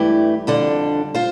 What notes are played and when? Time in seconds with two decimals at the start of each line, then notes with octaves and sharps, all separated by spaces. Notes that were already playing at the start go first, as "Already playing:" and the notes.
Already playing: G2 E3 A3 E4 G4
0.47 F2 D3 G3 D4
1.15 F4 C5